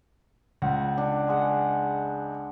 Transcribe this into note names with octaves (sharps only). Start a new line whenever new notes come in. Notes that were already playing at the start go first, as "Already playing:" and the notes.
C#2 F#5
D4
G#3 F#5